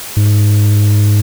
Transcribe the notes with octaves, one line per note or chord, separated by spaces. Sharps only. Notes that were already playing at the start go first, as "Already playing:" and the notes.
G#2